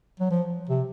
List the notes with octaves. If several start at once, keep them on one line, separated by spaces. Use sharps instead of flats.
F#3
F3
C3